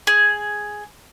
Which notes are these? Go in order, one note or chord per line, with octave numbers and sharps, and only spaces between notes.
G#4